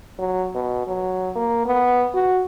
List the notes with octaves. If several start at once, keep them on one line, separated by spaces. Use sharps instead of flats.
F#3
B2
F#3
A#3
B3
F#4